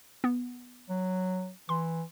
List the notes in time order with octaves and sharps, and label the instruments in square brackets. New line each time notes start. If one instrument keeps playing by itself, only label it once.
[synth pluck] B3
[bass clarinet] F#3
[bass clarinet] E3 [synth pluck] C6